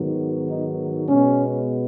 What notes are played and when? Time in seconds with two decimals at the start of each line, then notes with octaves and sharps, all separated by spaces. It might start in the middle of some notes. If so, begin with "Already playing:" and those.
Already playing: G#2 D#3 F#3 B3
0.50 D#4
1.09 B2 G#3 B3 C#4